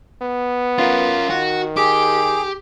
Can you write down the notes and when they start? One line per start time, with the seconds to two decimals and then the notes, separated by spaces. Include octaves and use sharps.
0.21 B3
0.78 C#4 F4 A#4
1.30 D#3 F#4
1.77 G4 G#4 D6